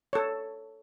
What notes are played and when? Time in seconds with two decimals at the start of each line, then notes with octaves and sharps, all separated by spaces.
0.13 A4 C#5